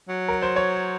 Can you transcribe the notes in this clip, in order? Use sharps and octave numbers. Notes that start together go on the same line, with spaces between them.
F#3
A#4
C5
C#5